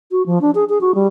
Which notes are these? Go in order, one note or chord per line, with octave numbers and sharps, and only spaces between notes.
F#4
F3
D4
G#4
G#4
F#4
G3